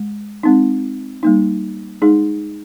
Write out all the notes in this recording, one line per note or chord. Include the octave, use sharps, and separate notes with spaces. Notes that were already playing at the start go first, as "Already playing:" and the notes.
Already playing: G#3
G#3 C4 D#4
G3 A#3 D#4
G#3 D#4 G#4